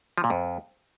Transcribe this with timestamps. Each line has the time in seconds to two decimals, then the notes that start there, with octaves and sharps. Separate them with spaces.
0.18 F3
0.24 A#2
0.30 F2